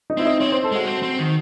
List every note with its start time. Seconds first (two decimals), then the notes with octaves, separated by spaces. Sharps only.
0.10 D#4
0.17 C4 E4
0.25 D#4
0.40 C4 C#5
0.52 C5
0.64 A4
0.72 G#3 F#4
0.87 C4
1.03 C4
1.19 D#3